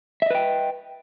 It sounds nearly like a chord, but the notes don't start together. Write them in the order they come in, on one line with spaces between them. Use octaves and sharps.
E5 D#5 B4 G5